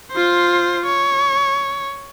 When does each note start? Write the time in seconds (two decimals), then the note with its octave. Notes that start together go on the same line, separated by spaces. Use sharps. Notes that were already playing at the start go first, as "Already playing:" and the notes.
0.12 F4 C5
0.85 C#5